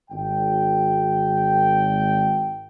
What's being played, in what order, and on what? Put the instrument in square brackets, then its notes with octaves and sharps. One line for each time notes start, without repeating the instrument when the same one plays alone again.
[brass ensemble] G#1 G5